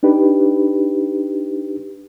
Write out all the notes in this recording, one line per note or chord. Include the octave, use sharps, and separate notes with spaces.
D4 D#4 G4 B4